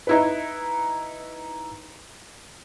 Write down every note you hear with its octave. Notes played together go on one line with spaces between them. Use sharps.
D#4 E4 B4